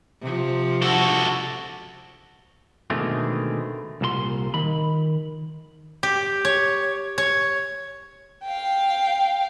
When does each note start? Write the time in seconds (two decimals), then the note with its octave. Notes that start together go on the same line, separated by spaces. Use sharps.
0.21 C3 F3
0.82 F#4 A4
2.90 B2 D3 D#3 G#3 A3 C4
4.01 C2 A#2 A4 C6
4.54 D#3 B5
6.03 G4
6.45 C#5
7.18 C#5
8.45 F5 G5